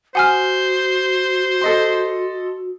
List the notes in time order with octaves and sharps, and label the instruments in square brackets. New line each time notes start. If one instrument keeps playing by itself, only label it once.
[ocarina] F#4 [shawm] C5 [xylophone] F#5 G#5 F6 [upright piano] D#6
[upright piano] A4 D#5 C6